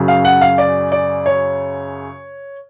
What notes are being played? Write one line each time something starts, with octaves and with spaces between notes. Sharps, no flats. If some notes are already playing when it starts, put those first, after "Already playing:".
Already playing: F#2 C#3 F#3
F5
F#5
F5
D5
D5
C#5